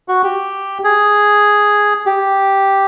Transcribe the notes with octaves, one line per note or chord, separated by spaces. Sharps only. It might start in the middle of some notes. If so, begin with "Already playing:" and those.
F#4
G4
G#4
G4